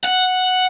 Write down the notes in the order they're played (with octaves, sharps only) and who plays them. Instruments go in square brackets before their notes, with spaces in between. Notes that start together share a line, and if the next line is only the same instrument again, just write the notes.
[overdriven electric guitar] F#5